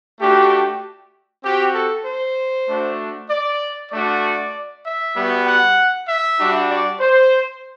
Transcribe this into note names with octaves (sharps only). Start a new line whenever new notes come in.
A3 D4 F#4 G4
C4 F#4 G4
A4
C5
A3 D4 F#4
D5
A3 D4 F#4 D5
E5
G3 B3 F#4
F#5
E5
G3 D4 F#4
D5
C5